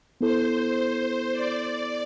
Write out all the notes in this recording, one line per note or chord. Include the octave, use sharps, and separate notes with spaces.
B3 E4 A4 C5
C5
D5